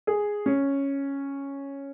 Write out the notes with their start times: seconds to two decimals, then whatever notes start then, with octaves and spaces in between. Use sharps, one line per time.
0.07 G#4
0.46 C#4